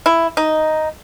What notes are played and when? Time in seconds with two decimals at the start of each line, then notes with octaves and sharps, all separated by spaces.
0.06 E4
0.37 D#4